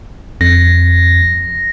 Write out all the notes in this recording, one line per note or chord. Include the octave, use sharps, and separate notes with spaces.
F2 A#6